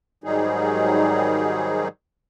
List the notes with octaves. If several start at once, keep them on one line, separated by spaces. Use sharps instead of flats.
G#2 D#3 F#3 G3 D#4 G#4